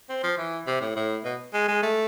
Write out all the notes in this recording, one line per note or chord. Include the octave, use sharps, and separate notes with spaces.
C4
F3
E3
C3
A2
A2
B2
G#3
G#3
A3